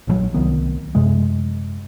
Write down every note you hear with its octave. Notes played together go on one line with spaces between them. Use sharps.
A#1 D3 F#3
C2 D#3 B3
F#2 C3 G#3